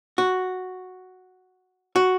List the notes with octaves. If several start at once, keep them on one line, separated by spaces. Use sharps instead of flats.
F#4
F#4